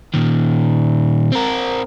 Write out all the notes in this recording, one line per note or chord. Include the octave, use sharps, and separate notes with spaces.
A#2 D#3
C4 A#4